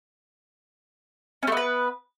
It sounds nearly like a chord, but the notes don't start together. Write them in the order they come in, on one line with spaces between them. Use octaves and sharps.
C#4 A3 B3 B4